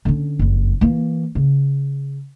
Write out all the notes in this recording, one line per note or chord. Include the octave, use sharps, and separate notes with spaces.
D3 C#4
F#1 F2
E3 A#3
C#3